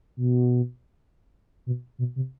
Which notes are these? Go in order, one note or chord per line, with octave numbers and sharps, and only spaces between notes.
B2
B2
B2
C3